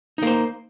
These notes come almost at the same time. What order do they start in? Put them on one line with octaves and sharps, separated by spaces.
D#4 A#3 C5